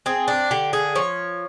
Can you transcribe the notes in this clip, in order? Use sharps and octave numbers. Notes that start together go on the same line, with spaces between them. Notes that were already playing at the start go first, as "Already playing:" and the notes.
C4 G#4
D4
D3 G4
G#4
F3 C#5